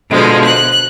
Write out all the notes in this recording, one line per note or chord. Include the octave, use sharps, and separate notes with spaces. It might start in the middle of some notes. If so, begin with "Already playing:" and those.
B2 D3 F3 G#3
F#6